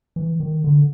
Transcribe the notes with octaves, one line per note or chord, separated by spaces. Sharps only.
E3
D#3
D3